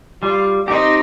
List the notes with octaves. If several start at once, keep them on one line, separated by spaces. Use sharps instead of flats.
G3 F4
C4 D#4 G4